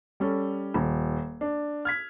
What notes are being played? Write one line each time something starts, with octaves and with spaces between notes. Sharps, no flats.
G3 C#4 A4
D#1
D4
F6 G#6 B6